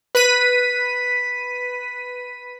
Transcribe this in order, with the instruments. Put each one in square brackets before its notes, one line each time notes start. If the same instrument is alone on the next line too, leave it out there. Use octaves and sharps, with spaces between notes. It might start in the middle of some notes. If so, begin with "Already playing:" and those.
[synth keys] B4 B6 D#7